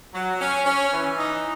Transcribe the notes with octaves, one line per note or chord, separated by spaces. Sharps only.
F#3
C#4
C#4
E3
D#4